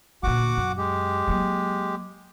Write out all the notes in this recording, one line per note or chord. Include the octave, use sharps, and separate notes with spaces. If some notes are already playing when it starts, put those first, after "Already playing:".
D2 A#2 F#4 F#5 D6
F#2
G#3 G4
F#3 A#3